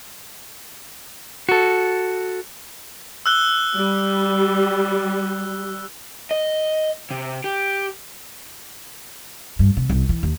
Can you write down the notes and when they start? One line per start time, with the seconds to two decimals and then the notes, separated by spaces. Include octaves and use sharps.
1.49 F#4 A4
3.26 E6 F#6 G7
3.76 G3
6.31 D#5
7.11 C3
7.44 G4
9.59 G2
9.77 C3
9.89 C2
10.09 E3
10.23 D#2